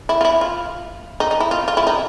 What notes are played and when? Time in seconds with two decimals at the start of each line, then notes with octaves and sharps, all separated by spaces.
0.09 E4
0.21 F4
0.25 E4
0.41 F4
1.20 D#4
1.31 D#4
1.40 E4
1.51 F4
1.68 F4
1.77 E4
1.87 D#4